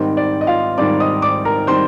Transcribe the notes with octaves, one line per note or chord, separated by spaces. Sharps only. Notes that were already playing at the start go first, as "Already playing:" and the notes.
Already playing: G#2 D#3 G3 C4
D5
D#5
F4 F5
G#2 D#3 G3 C4 D5 D6
D#5 D#6
D5 D6
A#4 A#5
D#3 G3 C4 C5 C6